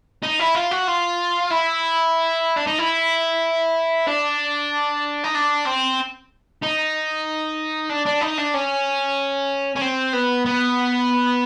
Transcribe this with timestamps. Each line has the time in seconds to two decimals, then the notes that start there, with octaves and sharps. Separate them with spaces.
0.23 D#4
0.39 E4
0.55 F4
0.71 F#4
0.88 F4
1.51 E4
2.57 D4
2.67 D#4
2.79 E4
4.07 D4
5.24 D#4
5.35 D4
5.66 C4
6.62 D#4
7.90 D4
8.06 D4
8.21 D#4
8.38 D4
8.54 C#4
9.76 C#4
9.82 C4
10.13 B3
10.46 B3